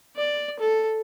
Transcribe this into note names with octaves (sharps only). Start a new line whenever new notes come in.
D5
A4